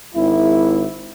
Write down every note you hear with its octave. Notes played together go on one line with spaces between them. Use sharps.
G#1 E4